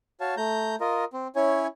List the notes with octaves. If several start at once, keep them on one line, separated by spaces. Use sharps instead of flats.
F#4 C#5 F5 A5
A3 A#5 G6
F4 A#4 D#5
C4
C#4 E4 C#5 G#5